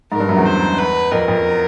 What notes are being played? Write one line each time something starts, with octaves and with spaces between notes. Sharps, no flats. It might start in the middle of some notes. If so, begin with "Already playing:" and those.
G#2 A#4
G2
F#2
E2
C5
B4
F2 A#4
F2